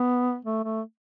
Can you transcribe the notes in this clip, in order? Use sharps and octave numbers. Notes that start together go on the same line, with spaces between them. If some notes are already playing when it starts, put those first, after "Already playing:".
Already playing: B3
A3
A3